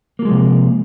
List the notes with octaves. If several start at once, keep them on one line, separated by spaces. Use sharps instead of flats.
C3 F3 F#3 G#3 A#3